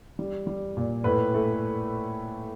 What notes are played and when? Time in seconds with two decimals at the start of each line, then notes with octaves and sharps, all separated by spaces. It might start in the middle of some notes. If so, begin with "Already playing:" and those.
0.19 G3
0.47 G3
0.77 A#2
1.04 A2 B4
1.34 A3